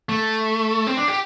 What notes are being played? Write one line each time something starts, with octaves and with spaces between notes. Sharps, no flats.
A3
C4
D4
G4